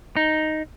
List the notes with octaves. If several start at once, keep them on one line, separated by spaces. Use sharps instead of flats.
D#4